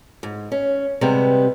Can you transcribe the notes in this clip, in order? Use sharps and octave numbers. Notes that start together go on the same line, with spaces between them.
G#2
C#4
C3 G3 G#3 B3